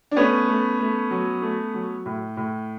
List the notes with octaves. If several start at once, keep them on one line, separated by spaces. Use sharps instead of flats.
D4
A3 B3 C#4
A3
A3
F#3
A3
F#3
A2
A2